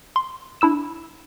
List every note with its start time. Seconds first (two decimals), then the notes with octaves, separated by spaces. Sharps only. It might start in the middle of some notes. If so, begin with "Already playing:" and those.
0.16 C6
0.61 D4 E4 E6 E7